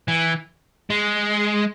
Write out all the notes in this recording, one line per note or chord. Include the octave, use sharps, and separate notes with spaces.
E3
G#3